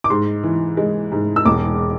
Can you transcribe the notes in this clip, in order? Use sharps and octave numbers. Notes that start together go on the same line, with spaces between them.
D6
G#2 C6
E3
G#3
G#2
E6
E1 D6